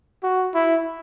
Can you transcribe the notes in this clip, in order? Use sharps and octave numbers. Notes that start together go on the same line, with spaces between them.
F#4
E4